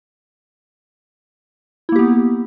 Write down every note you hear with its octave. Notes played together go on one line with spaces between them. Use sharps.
A#3 B3 E4 G4